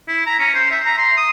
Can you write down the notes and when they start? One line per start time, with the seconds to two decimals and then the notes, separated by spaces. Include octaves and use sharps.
0.08 E4
0.26 A#5
0.39 C#4
0.54 C5
0.71 E5
0.84 A#5
0.98 C6
1.17 D#6